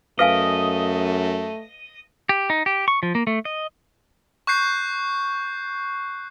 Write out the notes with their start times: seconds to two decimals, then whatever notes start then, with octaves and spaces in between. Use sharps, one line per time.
0.19 F#2 A3 B4 D#5 F5 G#5
2.29 G4
2.50 D#4
2.66 G4
2.88 C#6
3.03 F3
3.15 A#3
3.27 A3
3.45 D#5
4.47 C#6 F#6 G6 C7